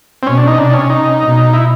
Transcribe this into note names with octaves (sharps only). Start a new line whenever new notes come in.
C4
B2 C#4
D4
D#4
C3 D4
C#4
D#4
B2
E4